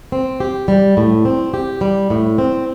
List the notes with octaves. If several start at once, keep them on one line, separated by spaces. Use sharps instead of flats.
C4
G4
G3
A2
C4
G4
G3
A2
C4